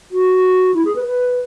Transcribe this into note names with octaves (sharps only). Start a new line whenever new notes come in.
F#4
E4
G#4
B4
B4